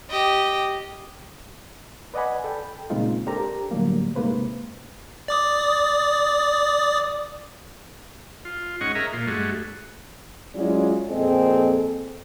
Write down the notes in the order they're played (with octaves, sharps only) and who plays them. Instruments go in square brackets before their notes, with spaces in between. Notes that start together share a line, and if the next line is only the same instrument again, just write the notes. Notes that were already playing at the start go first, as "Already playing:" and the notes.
[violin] G4 D#5
[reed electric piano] B4 D5 D#5 F#5 G#5 B5
A4 G5 B5
A#2 C#3 G#3 C4 D#4 F4
D4 G4 A4 A#4 C5 A#5
A2 D3 F#3 G3 A#3
G#2 C3 A#3 B4 C5
[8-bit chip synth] D5 D6 D#6
[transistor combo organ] F4
G#2 C#4 D#5 F#5 C#6
G#4 A#4 D#5 E5 A#5
A#2 F4
G2 G#3 A3 F#4
[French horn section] F#3 G#3 C#4 E4 F4 D5
F2 A#2 C4 G#4 A4 D#5